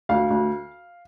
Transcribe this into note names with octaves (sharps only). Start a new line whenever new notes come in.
D2 F5
D2